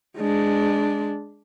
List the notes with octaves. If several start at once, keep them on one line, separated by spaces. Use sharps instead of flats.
G#3 D4